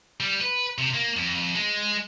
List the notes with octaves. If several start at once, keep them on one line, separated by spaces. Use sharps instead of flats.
G3
B4
C3
A#3
F2
G#3